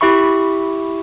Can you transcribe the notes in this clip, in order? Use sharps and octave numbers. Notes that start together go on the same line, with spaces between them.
E4 G4 E5 B5 C#6